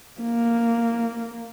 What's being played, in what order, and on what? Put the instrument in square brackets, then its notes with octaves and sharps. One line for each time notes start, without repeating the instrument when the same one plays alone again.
[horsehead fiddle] A#3